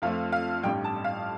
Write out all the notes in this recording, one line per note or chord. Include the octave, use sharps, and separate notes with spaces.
F2 F3 A3 C4 F5
F5
A1 G2 G3 G5
A5
F5